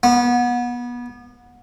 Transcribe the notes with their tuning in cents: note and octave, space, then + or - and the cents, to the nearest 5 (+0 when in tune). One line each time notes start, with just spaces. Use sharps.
B3 -25